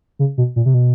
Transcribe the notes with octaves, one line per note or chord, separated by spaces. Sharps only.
C#3
B2
A#2
C3
B2